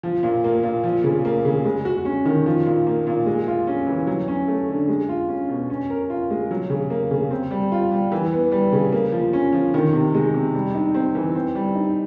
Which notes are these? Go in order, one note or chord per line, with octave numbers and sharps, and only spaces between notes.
F3
A#2
A#3
A#2
F3
C#3
A#3
C#3
G#3
F#4
C#4
D#3
F3
A#2
A#3
A#2
G#3
F4
C#4
E3
F#3
C#4
A3
D3
G#3
F4
C#4
B2
C#4
A#4
F4
G#3
F#3
C#3
A#3
C#3
C4
G3
F4
G3
E3
B3
G3
C#3
A#3
F3
C#4
F3
D#3
C3
G#3
C3
G3
D#4
C4
E3
C4
G3
D#4